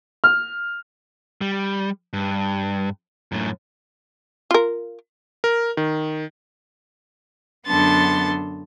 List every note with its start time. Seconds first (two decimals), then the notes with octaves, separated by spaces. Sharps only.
0.24 F6
1.41 G3
2.13 G2
3.32 F#2 A2
4.51 F4 A#4
5.44 A#4
5.77 D#3
7.67 F#2 D3 B3 A5 C6 A6